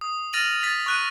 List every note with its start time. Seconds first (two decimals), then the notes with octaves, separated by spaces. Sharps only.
0.01 D#6
0.33 F6 A6 A#6 D#7 F7 F#7
0.63 A6 B6
0.86 C#6 F#6 D#7